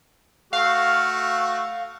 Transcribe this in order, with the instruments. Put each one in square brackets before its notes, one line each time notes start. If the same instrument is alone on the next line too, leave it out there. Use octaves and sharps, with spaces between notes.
[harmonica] A3 F#4 [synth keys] F5